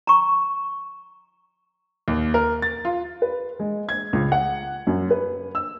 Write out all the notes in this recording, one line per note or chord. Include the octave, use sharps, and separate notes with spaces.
A#5 C#6
D#2
A#4
A6
F4
B4
G#3
G#6
C#2
F#5
F#2
B4
E6